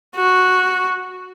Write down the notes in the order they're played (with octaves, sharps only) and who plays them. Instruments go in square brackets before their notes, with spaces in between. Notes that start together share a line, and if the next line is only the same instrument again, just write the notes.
[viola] F#4